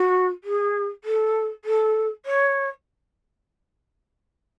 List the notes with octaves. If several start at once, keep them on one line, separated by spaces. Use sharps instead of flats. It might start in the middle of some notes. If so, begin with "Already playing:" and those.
Already playing: F#4
G#4
A4
A4
C#5